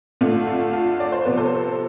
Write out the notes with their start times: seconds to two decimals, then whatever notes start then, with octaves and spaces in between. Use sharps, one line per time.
0.21 D3 A3 F4
0.47 F4
0.73 F4
1.00 D5
1.12 C5
1.25 C3 F3 B3 B4
1.37 A4 C5